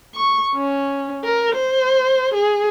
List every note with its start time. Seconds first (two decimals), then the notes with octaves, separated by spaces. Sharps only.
0.15 C#6
0.55 C#4
1.24 A#4
1.55 C5
2.34 G#4